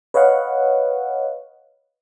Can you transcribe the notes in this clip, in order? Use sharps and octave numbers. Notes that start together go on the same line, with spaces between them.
B4 C#5 D#5 F5 F#5